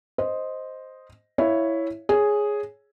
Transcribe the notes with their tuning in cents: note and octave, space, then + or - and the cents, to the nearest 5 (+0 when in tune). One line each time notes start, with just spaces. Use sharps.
C5 +0 D#5 +0
E4 +0 C#5 +0 F5 +0
G#4 +0 C#5 +0